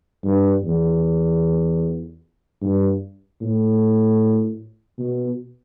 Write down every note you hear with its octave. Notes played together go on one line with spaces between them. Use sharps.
G2
E2
G2
A2
B2